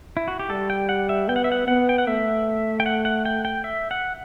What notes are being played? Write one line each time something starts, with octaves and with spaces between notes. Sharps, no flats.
E4
F#4
G4
G3 A4
G5
F#5
E5
B3 G5
F#5
E5
F#5
B3 F#5
G5
F#5
A3 E5
G5
F#5
F#5
G5
G5
E5
F#5